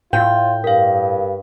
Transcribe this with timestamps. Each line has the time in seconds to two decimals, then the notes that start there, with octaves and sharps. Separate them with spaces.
0.13 A2 F4 G5
0.64 G2 A#4 F5